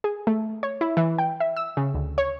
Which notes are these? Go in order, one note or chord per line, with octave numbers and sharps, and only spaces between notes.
G#4
A3
C#5
E4
E3
G5
E5
E6
C#3
D2
C#5